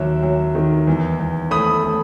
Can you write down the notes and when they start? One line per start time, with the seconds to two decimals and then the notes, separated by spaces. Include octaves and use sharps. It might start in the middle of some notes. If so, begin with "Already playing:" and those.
Already playing: D#2 F#3 E5
0.23 F#3
0.55 D#3
0.87 E2
1.20 E2
1.51 A3 B5 D#6
1.84 A3